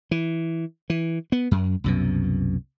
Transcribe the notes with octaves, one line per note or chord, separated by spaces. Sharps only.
E3
E3
B3
F#2
C2 F#2 B2